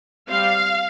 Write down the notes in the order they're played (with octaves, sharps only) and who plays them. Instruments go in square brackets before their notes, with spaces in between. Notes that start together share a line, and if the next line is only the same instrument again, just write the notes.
[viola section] G3 C4 F5